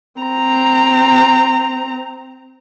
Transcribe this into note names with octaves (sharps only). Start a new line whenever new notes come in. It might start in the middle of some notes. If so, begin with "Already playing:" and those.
C4 A#5